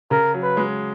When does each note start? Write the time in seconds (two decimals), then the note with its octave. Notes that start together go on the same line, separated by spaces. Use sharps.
0.11 C#3 A#4
0.34 F#3
0.43 B4
0.57 G#3